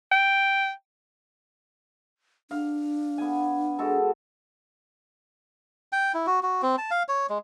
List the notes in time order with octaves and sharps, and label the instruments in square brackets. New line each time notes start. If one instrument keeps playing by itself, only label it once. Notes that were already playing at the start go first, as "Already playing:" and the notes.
[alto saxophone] G5
[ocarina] D4 [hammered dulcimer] F5
[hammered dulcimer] B3 G#5
G#3 F#4 A4
[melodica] G5
E4
F#4
F#4
C4
A5
F5
C#5
G#3